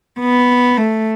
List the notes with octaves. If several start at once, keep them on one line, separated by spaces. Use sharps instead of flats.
B3
A3